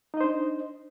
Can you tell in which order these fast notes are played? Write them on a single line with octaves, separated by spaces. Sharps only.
D#4 D#5 C5 D4